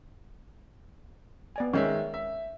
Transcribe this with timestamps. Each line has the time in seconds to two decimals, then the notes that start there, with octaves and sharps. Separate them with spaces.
1.56 B3 D5 G#5
1.74 D#3 G#3 C#4 E5
2.14 E5